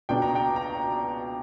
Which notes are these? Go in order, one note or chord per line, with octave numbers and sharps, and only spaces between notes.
C#2 B2 A#3 D4 G5
A#5
G5
A#5